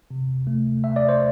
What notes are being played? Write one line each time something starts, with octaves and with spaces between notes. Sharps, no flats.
C3
A3
C3 E5
D5
C5